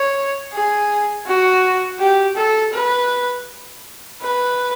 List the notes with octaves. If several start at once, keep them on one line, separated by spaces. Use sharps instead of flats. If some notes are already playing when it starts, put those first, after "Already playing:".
Already playing: C#5
G#4
F#4
G4
A4
B4
B4